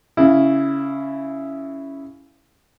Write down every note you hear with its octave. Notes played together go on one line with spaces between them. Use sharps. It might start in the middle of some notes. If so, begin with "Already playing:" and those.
C#3 E4